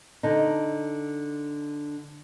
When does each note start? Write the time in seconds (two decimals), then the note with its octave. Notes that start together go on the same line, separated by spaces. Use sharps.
0.23 D3 D#4